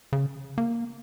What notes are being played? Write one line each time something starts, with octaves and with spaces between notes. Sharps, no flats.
C#3
A#3